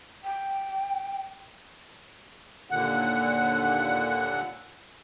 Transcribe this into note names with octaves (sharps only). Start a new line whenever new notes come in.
G5
D#2 A#2 D3 F#5